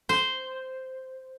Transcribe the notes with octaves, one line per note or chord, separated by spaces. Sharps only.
C5